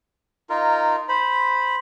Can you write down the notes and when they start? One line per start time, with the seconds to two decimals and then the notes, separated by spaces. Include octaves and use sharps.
0.50 D#4 F4 A#4
1.09 C5 B5